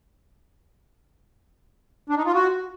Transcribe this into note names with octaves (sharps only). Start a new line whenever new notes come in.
D4
D#4
F4
F#4